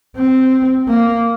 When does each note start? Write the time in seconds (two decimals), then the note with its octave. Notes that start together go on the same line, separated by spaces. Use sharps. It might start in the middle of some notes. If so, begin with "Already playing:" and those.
0.17 C4
0.88 A#3